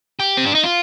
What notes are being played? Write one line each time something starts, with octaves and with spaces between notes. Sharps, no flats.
G4
C4
D4
D#4
F4